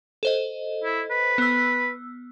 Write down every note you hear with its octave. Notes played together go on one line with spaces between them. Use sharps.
A4 C5 D#5
E4
B4
B3 E6